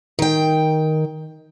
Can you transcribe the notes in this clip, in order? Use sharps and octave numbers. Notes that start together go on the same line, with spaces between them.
D#3 G5